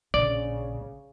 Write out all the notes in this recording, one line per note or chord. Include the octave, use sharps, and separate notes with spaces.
A#1 C#3 D5